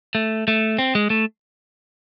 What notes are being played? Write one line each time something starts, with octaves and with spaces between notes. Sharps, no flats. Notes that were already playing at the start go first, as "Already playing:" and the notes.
A3
A3
C4
G#3
A3